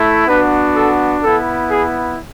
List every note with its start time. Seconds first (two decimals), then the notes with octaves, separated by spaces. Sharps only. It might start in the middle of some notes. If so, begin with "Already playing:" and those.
Already playing: A3 E4
0.26 B3 D4 F#4 B4
0.75 A4
1.22 B3 E4 A4
1.70 G#4